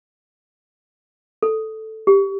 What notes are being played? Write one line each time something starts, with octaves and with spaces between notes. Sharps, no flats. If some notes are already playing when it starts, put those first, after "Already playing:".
A4
G4